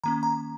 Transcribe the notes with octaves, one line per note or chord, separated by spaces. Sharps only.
D#3 A#3 C#4 A#5
A#5